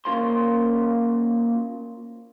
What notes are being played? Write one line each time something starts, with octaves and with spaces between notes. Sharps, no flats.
A#3 C#4 F4 A#4 C5 C6